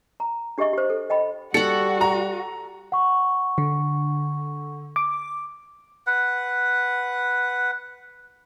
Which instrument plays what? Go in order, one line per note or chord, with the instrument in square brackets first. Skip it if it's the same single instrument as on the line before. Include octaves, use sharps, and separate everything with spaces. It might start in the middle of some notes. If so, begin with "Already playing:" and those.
[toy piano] A#5
D4 G4 G#4 D#5 E5 C#6
G4 C5
A4
D#5 G5 B5
[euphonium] G3 [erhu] F#4 [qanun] A4 F#5 [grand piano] C#7
[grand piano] A#5
[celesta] F#5 C#6
[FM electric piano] D3
D6
[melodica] B4 F#5